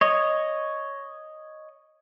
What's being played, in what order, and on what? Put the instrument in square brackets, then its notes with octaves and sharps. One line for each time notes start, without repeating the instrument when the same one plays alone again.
[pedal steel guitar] C#5 D#5